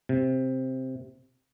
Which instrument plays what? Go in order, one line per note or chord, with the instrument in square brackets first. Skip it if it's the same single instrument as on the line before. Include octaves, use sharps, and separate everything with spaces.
[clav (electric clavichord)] C3